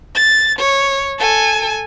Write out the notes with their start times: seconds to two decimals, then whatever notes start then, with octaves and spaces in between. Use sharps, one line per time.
0.15 A6
0.59 C#5
1.18 A4 G#5